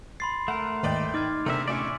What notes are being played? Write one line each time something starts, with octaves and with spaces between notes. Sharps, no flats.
B5 C6 A6 C7
A3 A#4 F#5
D#2 G#2 B4 D5 D#5 G5
D#4 D6 F6 G#6 A6
E2 C3 A3 C4 D4 A#4 E5
A2 C#4 D4 D5 E5 C#6